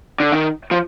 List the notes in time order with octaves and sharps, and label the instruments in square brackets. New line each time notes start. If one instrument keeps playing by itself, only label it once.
[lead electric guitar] D3
D#3
F3